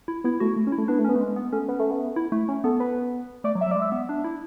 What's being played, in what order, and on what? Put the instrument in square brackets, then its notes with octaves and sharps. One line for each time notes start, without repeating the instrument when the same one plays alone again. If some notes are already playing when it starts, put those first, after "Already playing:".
[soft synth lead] E4
[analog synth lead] B3 [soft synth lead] E4
[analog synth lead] A3 [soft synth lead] F#4
[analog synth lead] A3
C#4
[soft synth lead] E4
[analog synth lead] A3
[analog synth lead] B3 [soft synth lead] D4
[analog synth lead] A3
[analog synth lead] B3 [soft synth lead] C#4
[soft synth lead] A3
G#3
B3
[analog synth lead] A3 [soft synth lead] C#4
[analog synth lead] B3
A3
B3
[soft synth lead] E4
A3
[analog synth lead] C#4
[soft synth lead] B3 [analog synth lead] A4
[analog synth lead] B4
[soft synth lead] A3 [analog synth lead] D5
[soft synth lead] F#3
[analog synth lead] E5
[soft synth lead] F#3
[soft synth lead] G#3 [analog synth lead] D5
[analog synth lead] E5
[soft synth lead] B3
D4
E4